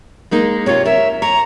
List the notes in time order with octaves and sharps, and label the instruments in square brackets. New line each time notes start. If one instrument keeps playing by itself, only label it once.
[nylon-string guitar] G#3 A#3 D#4
[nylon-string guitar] C3 F4 [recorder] C#5
[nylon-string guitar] A#4 [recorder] E5
[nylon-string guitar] C#5 [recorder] A#5